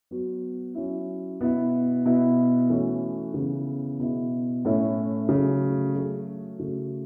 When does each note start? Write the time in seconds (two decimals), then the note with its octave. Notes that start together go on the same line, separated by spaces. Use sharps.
0.11 F#3 B3 F#4
0.74 F#3 C#4 E4
1.41 B2 B3 E4
2.05 B2 B3 E4
2.69 E3 A3 C#4 F#4
3.34 C#3 E3 B3
3.99 B2 B3 E4
4.65 A2 A3 C#4 E4
5.29 C#3 F#3 A3
5.95 F#3 A3 F#4
6.59 C#3 A3 F#4